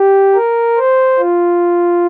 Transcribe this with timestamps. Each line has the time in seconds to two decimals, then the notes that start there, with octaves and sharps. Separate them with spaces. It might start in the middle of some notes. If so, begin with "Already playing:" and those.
Already playing: G4
0.35 A#4
0.77 C5
1.19 F4